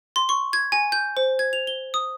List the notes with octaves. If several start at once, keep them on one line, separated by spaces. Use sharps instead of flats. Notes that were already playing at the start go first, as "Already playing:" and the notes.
C6
C#6
G#6
G#5
G6
C5
G#6
F7
G7
D#6